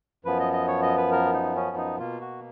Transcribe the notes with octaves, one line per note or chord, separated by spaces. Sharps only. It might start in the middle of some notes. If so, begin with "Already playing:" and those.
F#2 F3 B3 B4
D#5
D#5
C#5
D#5
B4
A#4
D#4
C#4
D#4
B2 A#3 F4
F#4